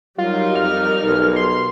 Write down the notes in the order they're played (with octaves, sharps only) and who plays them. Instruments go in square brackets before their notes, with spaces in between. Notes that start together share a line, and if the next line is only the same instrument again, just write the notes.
[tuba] F#3 [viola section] G3 D#4 A#4 [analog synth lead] F4
[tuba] F2 [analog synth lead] F6
[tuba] B1
[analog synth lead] C6